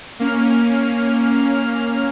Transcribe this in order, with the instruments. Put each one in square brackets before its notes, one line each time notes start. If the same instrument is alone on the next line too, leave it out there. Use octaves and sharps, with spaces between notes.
[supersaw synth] A#3 C#4 F6